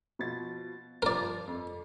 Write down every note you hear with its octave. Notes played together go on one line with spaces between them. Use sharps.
B2 F3 A6
G2 F3 A#4 D5
F2